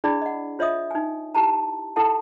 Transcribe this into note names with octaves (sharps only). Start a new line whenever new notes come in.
D4 E4 G#4 D5 B5
D#5 F#5
F4 C#5 D#5 E5 D#6
D#4 G#5
E4 G4 A5 A#5
E4 A4 F#5 A5